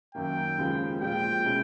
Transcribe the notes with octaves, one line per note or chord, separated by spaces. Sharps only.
F#2 D#3 F#3 A#3 G5
D#2 C#3 F3 G#3
A#2 F3 G#3 G5
B2 G#3 C#4 E4